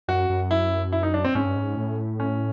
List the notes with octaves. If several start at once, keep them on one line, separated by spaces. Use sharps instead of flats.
F#2 F#4
F#2
E4
E4
D#4
D4
C4
G#2 C#4
G2
G#2
A2
C#4